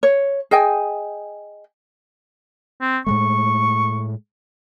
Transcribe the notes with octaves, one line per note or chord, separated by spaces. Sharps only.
C#5
G#4 D#5 G5 G#5
C4
A2 G#3 A3 C#6